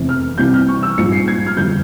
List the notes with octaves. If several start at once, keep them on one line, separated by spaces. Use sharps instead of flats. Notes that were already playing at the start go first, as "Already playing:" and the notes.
Already playing: F1 E2 C3
F6
C2 C3 E3 G3 C4 G6
F6
C#6
E6
A#1 G#2 G3 C#7
C7
G#6
F6
G1 F2 E3 G3 G6